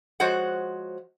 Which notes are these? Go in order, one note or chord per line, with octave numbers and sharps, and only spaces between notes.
F3 G#3 F#4 C5 C#5 F#5